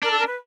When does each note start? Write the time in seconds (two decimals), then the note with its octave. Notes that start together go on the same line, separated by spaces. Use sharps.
0.03 D4 A#4
0.10 A4
0.19 A#4
0.27 B4